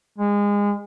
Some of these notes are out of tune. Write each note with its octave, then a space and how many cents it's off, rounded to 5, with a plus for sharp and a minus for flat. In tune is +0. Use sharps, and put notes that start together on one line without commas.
G#3 -25